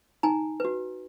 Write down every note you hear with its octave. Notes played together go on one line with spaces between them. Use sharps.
D#4 G#5 A#5
F#4 B4